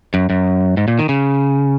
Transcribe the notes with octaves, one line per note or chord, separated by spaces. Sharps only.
F#2
F#2
G#2
A#2
D#3
C#3